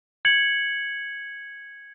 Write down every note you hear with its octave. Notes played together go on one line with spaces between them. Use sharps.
G#6 C#7 F#7